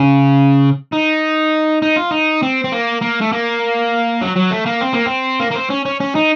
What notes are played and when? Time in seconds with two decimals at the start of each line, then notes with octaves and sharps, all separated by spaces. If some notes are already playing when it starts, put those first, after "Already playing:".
Already playing: C#3
0.93 D#4
1.82 D#4
1.96 F4
2.11 D#4
2.43 C4
2.64 C4
2.72 A#3
3.01 A#3
3.21 A3
3.32 A#3
4.22 F#3
4.36 F#3
4.51 A3
4.66 A#3
4.81 C4
4.93 A#3
5.06 C4
5.40 A#3
5.51 A#3
5.55 C4
5.70 C#4
5.86 C#4
6.00 C#4
6.15 D#4